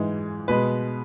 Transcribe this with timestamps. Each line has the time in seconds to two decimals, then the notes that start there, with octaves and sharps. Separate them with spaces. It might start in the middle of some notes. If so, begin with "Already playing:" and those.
Already playing: G#2 E3 G#3
0.48 B2 G#3 B4